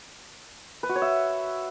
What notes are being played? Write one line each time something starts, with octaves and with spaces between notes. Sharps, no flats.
B4
F#4
C#5
E5